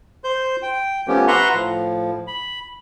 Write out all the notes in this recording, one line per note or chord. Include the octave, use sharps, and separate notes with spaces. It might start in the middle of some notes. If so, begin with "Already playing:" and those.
C5 G6
G5
F3 A3 B3 C#4 G4
B4 E5 F#5 A#5 C6 C#6
A2 F3
B5